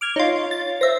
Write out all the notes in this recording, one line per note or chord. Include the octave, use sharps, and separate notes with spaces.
D6 F6 G#6
D#4 F4 C#5
A6
C5 E5 A#6